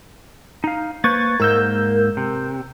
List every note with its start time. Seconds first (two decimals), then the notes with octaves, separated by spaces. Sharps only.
0.64 D#4 F5
1.04 A#3 B4 C5 C#6 G#6 A6
1.40 G#2 A#3 A#4 E6 G6
2.17 C3